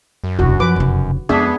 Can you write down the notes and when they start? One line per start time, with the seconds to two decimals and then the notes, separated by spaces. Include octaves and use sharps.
0.24 F#2
0.39 E1 C2 F#4
0.60 F3 B4 D6
0.76 F1 C#3
1.29 F2 G#3 B3 D4 G#4 E5